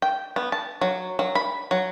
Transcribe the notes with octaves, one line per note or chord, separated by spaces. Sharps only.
G5
B3
A5
F#3
F#3
B5
F#3